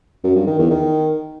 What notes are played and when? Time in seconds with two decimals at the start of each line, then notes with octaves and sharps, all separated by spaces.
0.24 F#2
0.35 G2
0.47 D#3
0.58 E2
0.70 D#3